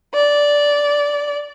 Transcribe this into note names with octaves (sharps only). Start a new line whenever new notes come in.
D5